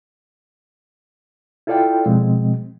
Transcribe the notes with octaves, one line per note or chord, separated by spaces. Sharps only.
E4 F4 A4 D5 F5 G5
B2 F3 G#3 C4